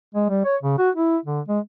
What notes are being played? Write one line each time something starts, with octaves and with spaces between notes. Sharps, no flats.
G#3
G3
C#5
C#3
F#4
E4
D3
G#3